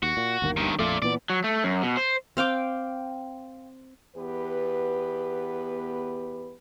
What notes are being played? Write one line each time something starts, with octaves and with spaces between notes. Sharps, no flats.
D#2 F#4
A#2
G1 D#2 A#3
G2 D#3
A#1 F2 A3 F4 D5
A#2 E3 B3 D5
F#3
A3
F#2
B2
C5
C4 F5 G5 D6
E2 B3 G4 B4